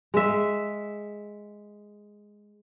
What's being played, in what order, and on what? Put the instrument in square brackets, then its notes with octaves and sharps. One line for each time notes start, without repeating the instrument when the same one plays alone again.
[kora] G#3 E5